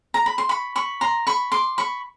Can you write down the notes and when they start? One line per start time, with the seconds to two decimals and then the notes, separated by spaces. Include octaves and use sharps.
0.14 A#5
0.26 B5
0.38 C6
0.49 B5 C#6
0.76 B5 C#6
1.01 A#5 C6
1.27 B5 C#6
1.52 C6 D6
1.78 B5 C#6